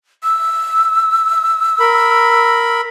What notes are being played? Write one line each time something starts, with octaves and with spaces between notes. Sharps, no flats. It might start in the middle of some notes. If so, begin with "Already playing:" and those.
E6
A#4 B5